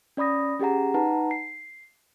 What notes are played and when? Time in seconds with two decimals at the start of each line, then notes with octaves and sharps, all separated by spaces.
0.17 C#4 D5 B5 D#6 A#6
0.59 C#4 G4 G#4 F#5 A#5
0.94 D#4 B4 F#5 A5 A#5
1.31 C7